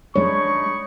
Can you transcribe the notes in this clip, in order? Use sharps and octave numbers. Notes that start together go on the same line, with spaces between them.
G#3 D4 D#4 C#5 B5 C#6